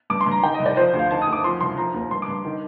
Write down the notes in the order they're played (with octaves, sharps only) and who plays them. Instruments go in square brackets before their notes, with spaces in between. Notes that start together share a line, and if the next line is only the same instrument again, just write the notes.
[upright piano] G2 D6
C6
G2
A#5
D#3 G5
D#5
C2
D5
F3 C5
D2
F5
D#3 A5
D#6
D2
D6
F3 C6
C2 C6
F3 A#5
D#2
G2 C6
D6
G2
D#3